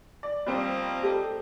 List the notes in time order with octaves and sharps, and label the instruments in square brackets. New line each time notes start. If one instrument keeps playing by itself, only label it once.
[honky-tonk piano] D5
[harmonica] F3 A#3 D#5 [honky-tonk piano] G3 C4
[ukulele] G4 A4